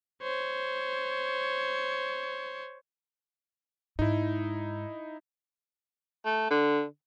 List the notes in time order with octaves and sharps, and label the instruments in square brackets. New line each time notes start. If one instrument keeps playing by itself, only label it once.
[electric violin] C5 C#5
[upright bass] G#2 [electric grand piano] D#4 E4
[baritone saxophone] A3
D3